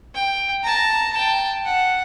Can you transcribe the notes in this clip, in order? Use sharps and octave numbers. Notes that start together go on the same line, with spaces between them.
G5
A5 A#5
G5 A5
F#5